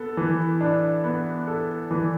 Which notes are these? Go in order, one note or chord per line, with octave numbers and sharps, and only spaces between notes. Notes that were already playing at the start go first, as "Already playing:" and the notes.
Already playing: B3 A4
E3
D4
B3
A4
E3